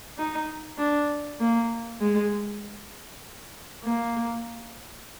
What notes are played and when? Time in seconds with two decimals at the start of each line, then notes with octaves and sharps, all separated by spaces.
0.18 D#4
0.78 D4
1.41 A#3
2.01 G#3
3.84 A#3